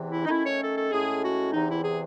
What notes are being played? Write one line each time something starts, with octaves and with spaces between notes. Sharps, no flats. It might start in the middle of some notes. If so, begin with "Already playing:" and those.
Already playing: E2 C3 E3
E4
D#4
D#3 A3 C#4 E4
C#5
A4
A4
A2 G#3 C#4 G#4
F#4
E2 C3 E3 D#4
E4
G#4